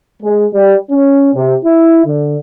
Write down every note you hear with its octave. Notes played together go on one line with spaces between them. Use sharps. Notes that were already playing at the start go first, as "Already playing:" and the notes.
G#3
G3
C#4
C3
E4
D3